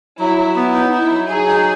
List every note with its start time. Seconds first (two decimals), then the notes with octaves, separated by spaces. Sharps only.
0.19 F#3 E4
0.38 F#3
0.56 B3 E4
0.74 D#4
0.92 D#4 E4
1.10 F#3
1.29 F#3 G#4
1.47 D#4